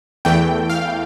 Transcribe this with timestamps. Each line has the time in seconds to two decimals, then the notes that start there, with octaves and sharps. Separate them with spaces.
0.25 E2 E3 A3 G5
0.70 F5